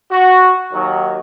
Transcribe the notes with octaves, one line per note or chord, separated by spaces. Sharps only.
F#4
D#2 D#3 F#3